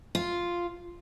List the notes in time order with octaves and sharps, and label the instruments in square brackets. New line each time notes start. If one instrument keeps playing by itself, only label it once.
[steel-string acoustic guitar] F4